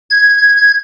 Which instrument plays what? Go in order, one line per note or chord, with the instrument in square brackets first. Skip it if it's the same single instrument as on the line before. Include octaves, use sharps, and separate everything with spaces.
[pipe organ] G#6